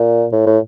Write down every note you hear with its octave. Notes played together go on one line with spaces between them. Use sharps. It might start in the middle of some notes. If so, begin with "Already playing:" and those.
Already playing: A#2
A2
A2